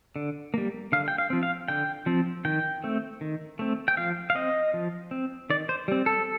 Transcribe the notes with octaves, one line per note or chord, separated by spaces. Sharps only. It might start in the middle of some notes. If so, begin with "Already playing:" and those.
D3
G3 A#3
D3 F5
G5
F5
F3 C4
F5
D3 G5
F3 C4
D#3 G5
A3 C4
D#3
A3 C4
G5
F3 F5
F5
C4 D#5
F3
C4
D#3 D5
C5
G3 C4
A4